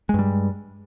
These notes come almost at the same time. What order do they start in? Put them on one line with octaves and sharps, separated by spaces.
G#3 G2 G3